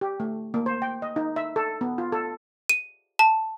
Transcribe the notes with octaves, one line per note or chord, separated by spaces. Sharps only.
G4
A3
A#3
C5
G5
D#5
D#4
E5
A4
B3
F4
A4
D#7
A5